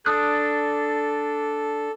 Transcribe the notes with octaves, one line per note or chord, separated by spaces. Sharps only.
D4 A4 D#6 F#6